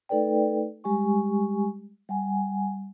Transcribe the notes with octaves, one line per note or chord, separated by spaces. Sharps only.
A3 D#4 A4 B4 D5 G5
G3 G#3 G4 G#5 C#6
G3 F#5 G#5